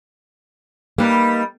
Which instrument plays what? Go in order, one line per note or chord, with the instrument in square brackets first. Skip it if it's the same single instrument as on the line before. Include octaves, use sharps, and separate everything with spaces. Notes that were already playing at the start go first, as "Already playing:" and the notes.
[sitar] G3 D#4 B4 [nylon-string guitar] A#3